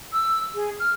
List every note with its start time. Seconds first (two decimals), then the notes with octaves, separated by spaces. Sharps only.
0.13 E6
0.55 G#4
0.80 F6